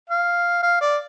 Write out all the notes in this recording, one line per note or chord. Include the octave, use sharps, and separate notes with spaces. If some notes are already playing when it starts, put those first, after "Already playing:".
F5
F5
D5